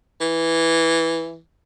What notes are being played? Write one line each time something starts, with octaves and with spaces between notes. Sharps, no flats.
E3